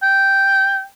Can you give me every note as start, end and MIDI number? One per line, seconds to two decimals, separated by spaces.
0.03 0.84 79